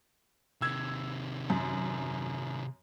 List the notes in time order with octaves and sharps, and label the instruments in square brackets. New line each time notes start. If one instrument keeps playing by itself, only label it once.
[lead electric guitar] C3 D#3 [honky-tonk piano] E6 G#6
[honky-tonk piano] F#2